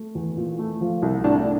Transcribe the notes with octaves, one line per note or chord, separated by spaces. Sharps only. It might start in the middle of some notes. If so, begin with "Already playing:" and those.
Already playing: A3
E2
A#2
A3
F3
C2
A2 D4